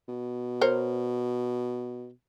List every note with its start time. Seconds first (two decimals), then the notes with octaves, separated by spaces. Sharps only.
0.08 B2
0.61 A#4 C5 C#5